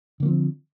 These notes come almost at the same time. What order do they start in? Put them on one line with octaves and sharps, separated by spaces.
D3 A#3 F3 C4